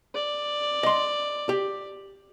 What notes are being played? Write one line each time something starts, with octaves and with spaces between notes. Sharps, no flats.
D5
D#5 C6
G4